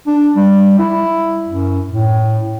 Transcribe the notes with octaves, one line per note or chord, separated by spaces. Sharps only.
D4
G3
E4
F#2
A2